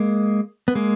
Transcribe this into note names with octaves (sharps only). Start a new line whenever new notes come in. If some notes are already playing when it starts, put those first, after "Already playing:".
Already playing: G#3 A#3
B3
G#3 A#3